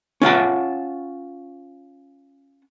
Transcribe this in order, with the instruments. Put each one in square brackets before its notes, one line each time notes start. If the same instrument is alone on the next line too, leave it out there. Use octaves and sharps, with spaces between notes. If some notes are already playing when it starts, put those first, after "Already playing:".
[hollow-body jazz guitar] C#4 F4 F#5 A5